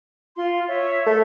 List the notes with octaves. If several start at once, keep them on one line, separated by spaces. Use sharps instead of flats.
F4 C6
C#5 E5
A3